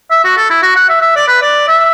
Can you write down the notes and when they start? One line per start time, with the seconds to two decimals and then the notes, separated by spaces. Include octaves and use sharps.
0.11 E5
0.24 F#4
0.37 A4
0.50 E4
0.63 F#4
0.76 F#5
0.89 E5
1.02 E5
1.16 D5
1.28 B4
1.42 D5
1.68 E5